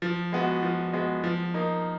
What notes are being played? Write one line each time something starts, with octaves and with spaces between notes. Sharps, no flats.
F3
G#3 B3 F#4
F3
G#3 B3 F#4
F3
A#3 D#4